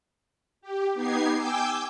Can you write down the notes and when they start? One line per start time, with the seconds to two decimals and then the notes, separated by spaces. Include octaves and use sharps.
0.61 G4
0.94 B3 D#4 G4 G#6 C7
1.35 G5 G#5 D6 E6 G6